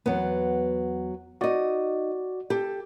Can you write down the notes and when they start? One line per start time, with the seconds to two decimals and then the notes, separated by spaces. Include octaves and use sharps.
0.06 E2 F#3 B3
1.41 D#4 F#4 D5 D#5
2.50 G4 A4